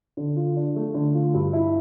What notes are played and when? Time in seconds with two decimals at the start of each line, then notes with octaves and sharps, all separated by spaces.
0.17 D3
0.36 F4
0.56 D4
0.76 A3
0.94 D3
1.14 F4
1.34 G2
1.53 E4